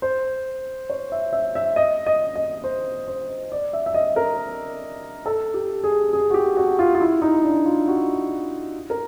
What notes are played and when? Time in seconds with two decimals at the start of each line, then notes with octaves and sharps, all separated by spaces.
0.02 C5
0.90 C#5
1.12 E5
1.33 E5
1.55 E5
1.76 D#5
2.06 D#5
2.36 D#5
2.64 C5
3.08 C5
3.52 D5
3.73 E5
3.86 E5
3.94 D#5
4.16 A#4
5.26 A4
5.54 G4
5.84 G#4
6.13 G#4
6.30 F#4
6.34 G4
6.57 F#4
6.79 F4
6.95 F4
7.01 E4
7.22 D#4
7.43 D4
7.65 F4
7.88 F#4
8.90 A#4